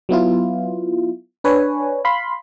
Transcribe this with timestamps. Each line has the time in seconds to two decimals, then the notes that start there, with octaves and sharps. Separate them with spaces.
0.09 F#3 B3 E4 F4
1.44 D4 B4 C#5 G#5
2.05 F5 B5 C6